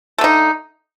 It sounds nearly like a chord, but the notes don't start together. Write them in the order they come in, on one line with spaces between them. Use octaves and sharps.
A3 D3 D#4